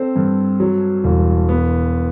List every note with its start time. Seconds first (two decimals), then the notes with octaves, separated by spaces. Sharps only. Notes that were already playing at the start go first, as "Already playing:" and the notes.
Already playing: C4 A4 C5
0.16 G2
0.60 F#3
1.04 E1
1.49 B3